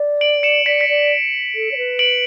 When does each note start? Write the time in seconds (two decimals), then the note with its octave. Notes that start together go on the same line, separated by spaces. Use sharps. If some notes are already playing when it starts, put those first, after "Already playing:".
Already playing: D5
0.21 D7 F#7
0.43 C#7 E7
0.65 D5 B6 D7
0.80 B6 D7
0.88 D5
1.54 A4
1.71 C#5
1.77 B4
1.99 D7 F#7